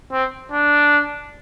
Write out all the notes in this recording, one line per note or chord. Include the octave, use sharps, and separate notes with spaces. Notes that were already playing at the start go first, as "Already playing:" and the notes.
C4
D4